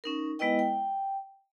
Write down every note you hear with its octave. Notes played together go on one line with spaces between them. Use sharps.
C#4 D#4 A#4
G#3 B3 E4 B4 D#5 G5
G5